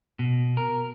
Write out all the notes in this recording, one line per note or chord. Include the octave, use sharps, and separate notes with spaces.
B2
A#4